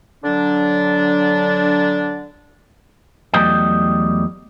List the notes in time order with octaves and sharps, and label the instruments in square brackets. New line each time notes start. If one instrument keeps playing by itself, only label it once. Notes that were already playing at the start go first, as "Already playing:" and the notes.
[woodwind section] D3 F#3 D4
[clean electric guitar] E2 F#3 G3 A3 D#5 G5